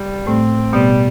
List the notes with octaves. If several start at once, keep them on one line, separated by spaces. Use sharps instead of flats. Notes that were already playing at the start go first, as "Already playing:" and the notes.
Already playing: G3
A2 A3 C4
B2 G3 B3